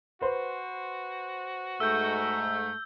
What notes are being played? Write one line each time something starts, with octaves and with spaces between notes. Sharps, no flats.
F#4 B4 C5
G#2 A3 E6 G6